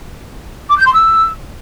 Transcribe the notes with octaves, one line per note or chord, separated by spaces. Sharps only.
D6
G6
C6
E6